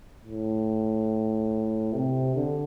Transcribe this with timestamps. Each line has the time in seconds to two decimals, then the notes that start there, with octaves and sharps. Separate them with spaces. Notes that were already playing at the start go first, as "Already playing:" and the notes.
0.25 A2
1.94 C3
2.36 D3